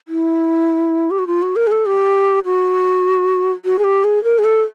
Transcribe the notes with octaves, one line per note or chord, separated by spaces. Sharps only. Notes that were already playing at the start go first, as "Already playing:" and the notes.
E4
G4
F#4
F4
F#4
A#4
G#4
A4
G4
F#4
F#4
G#4
G4
G#4
A#4
G#4
A4